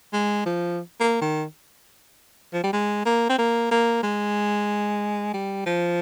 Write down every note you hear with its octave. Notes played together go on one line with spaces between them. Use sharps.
G#3
F3
A#3
D#3
F3
G3
G#3
A#3
C4
A#3
A#3
G#3
G3
F3